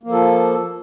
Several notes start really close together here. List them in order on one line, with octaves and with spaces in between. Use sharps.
A#3 F3 A4